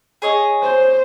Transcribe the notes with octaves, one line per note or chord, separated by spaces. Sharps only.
G#4 C#5 D#5
C5